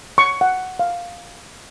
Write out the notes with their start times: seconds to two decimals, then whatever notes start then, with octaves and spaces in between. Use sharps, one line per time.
0.18 C#6
0.41 F#5
0.79 F5